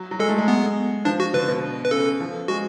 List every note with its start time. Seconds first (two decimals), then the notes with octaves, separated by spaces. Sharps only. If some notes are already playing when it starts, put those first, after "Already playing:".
Already playing: F#3
0.11 F#3
0.19 G#3 A4
0.29 A3
0.38 G#3
0.48 B3
1.05 F3 D4
1.20 F#4
1.33 D3 B4
1.48 B2
1.85 B4
1.91 C#3 A4
2.20 F3
2.48 G#3 F#4